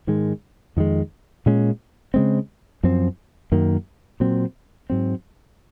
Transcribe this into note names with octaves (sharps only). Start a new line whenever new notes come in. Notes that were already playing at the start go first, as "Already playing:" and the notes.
G#2 D#3 G#3
F2 D#3 G#3
A#2 G#3 C#4
C#3 G#3 C4
F#2 F3 C4
F#2 D#3 A#3
A#2 F#3 C4
G#2 F#3 C4